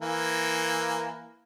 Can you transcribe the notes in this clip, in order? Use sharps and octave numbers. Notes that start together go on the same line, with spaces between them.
E3 A#3